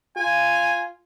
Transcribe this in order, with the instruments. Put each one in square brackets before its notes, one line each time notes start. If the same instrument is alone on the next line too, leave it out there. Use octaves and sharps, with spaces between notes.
[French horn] F4 [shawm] G#5